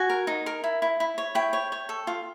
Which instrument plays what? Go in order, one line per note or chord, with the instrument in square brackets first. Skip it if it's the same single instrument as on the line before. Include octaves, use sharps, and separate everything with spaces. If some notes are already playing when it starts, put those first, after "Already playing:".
Already playing: [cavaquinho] F#4 G#5
A#4
D#4
A#4
E4
E4
E4
C#5
E4 G5
C#5
C#5
A4
F4